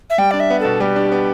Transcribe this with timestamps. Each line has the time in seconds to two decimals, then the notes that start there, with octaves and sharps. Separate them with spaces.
0.10 E5
0.18 G3 G5
0.31 D4 D5
0.40 E5
0.50 B3
0.60 B2 A4
0.80 G3 G4
0.96 D4
1.12 B3